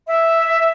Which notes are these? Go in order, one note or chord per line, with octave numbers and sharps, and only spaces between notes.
E5